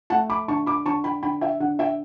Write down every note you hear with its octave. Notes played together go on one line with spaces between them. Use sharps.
A3 F#5 A5
B5 D6
D3 A5 C#6
B5 D6
D3 A5 C#6
G5 B5
D3 G5 B5
E5 G5
D3 F#5
E5 G5